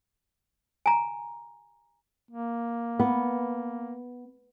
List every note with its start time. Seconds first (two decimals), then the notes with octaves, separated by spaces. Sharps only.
0.86 G#5 A#5
2.31 A#3
3.00 B3